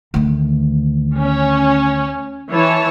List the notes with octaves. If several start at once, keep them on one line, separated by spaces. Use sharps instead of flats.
D2 D#3
C#4
E3 C#5 A5